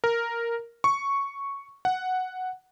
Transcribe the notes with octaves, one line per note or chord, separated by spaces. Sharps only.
A#4
C#6
F#5